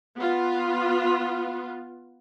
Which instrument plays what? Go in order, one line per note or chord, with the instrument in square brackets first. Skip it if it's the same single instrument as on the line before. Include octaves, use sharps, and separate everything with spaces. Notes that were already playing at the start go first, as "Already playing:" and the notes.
[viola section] B3 F4